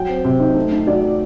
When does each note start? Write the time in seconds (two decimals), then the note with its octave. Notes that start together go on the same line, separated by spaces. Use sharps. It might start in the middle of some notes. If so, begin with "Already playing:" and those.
Already playing: F#3 G5
0.09 C4
0.24 C3
0.40 D#4
0.56 A3
0.72 D#4
0.87 F#3 D5
1.03 F#3